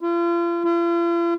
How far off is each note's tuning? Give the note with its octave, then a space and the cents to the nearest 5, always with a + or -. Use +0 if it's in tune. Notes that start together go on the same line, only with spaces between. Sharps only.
F4 -40
F4 -45